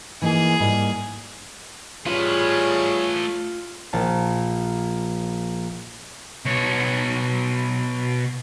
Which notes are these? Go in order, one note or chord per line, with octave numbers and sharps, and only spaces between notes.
E3 A#3 D#4 G#4
G#2 G3 A#3
G3 A3 F4 G#4 B4 C#5
A#1 A5
B2 C#5